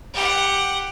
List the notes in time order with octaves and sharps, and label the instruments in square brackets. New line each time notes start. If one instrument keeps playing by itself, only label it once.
[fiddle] G4 F#5